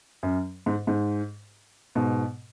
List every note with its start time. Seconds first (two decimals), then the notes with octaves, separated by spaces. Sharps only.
0.23 F#2
0.66 G#2
0.87 G#2
1.95 G#2 B2